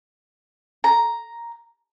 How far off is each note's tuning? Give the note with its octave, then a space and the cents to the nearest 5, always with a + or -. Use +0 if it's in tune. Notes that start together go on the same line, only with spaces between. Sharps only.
A#5 +5